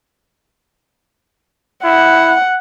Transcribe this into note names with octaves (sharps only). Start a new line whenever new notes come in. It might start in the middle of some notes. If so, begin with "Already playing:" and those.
E4 F#5